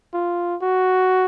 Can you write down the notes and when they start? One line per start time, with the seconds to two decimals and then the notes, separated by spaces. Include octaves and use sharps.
0.14 F4
0.62 F#4